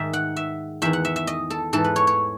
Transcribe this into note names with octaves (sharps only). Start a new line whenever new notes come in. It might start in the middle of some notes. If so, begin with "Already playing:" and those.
Already playing: G#2 D#3 E5
F#5
E5
E2 D#3 E5
F#5
E5
E5
D#5
A4
G#2 E3 A4
B4
C#5
C#5